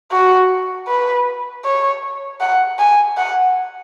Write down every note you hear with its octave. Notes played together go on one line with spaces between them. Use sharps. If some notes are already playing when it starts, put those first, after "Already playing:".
F#4
B4
C#5
F#5
G#5
F#5